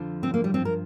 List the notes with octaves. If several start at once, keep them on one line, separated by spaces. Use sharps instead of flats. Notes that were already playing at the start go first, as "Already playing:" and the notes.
Already playing: F2 D3 F3
C4
A#3
G3
G2 F3 C4
A#4